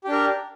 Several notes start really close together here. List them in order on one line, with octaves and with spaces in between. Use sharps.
G4 D4 A#4